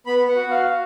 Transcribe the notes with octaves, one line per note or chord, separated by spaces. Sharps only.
B3 B5
F#5
F#4
F5
F#4